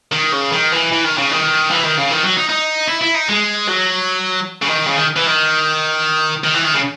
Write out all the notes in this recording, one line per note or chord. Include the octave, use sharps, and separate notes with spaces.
D#3
C#3
D#3
E3
E3
D#3
C#3
D#3
E3
D#3
C#3
D#3
F#3
D#4
D#4
E4
E4
D#4
G#3
F#3
C#3
D#3
C#3
D#3
E3
D#3
D#3
E3
D#3
C#3